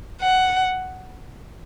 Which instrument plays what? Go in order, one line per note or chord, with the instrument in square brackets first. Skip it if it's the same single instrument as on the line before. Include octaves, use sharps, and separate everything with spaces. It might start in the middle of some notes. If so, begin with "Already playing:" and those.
[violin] F#5